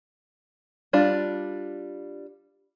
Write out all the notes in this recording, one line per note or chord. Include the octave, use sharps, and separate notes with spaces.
G3 D4 F4